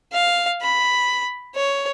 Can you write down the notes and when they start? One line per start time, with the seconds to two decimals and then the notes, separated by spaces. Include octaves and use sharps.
0.13 F5
0.62 B5
1.55 C#5